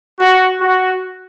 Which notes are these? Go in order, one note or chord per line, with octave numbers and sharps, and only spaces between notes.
F#4
F#4